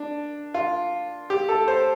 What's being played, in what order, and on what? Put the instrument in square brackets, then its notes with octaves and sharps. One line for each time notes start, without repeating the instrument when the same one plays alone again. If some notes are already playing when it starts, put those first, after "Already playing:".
Already playing: [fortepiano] D4
F4
G4
A4
C5